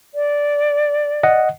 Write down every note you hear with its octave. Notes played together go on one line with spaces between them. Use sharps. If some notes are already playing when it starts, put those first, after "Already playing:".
D5
D#5 F#5